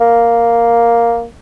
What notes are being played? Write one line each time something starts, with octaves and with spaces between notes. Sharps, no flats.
A#3